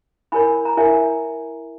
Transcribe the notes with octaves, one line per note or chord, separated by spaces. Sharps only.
E4 A#4 C#5 G#5 B5
A#5
E4 A#4 C#5 E5 G#5